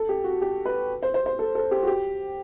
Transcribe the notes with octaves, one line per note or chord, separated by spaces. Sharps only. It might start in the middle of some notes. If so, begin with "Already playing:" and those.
Already playing: A4
G4
F#4
G4
B4
C5
C5
C5
A4
A4
G4
F#4
G4